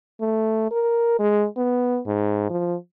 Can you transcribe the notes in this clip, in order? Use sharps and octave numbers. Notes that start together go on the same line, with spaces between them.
A3
A#4
G#3
B3
G#2
F3